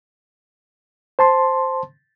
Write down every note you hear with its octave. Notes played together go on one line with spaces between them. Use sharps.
C5 A5 C6